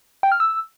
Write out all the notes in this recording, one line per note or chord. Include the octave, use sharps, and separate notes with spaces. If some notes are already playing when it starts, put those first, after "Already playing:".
G5
F6
E6